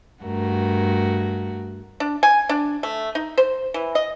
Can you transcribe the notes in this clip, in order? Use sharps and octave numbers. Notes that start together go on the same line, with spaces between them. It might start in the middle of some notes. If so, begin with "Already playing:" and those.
G2 A3 F#4 A#4
D4
G#5
D4
A3
D#4
C5
E3
D#5